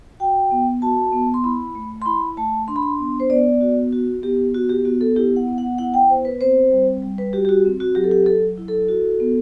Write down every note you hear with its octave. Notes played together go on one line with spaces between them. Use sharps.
F#4 G5
B3
F#4 A5
B3
C6
E4 B5
A3
C6
E4 B5
A3 A5
D4 C6
B5
C6
B3
C5
B3 D5
F#4
F#4
B3 G4
F#4
G4
B3 F#4
A4
E4 G4
F#5
B3
F#5
E4 F#5
G5
B3 C5
B4
C4 C5
G3
G3
B4
F#4 G4
G4
F#4
C4
F#4
F#3 G4
A4
G4
F#3 A4
E4
A4
F#4
B3